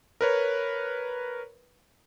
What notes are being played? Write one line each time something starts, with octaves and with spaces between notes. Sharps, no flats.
A#4 B4 C#5